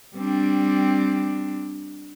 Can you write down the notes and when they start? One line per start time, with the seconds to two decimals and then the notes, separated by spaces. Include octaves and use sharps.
0.16 G3 C4 D4